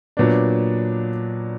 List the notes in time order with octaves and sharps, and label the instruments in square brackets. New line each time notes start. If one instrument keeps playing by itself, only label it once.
[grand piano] A#2 F#3 B3 D4